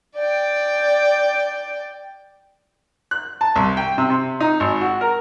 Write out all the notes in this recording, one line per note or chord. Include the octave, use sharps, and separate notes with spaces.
D5 G5
F#6
A5
C2
G5
C3
C3
D#4
G#1
F#4
A#4